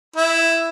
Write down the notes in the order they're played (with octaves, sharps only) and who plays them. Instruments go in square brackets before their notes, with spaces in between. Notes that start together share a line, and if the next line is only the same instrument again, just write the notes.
[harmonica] E4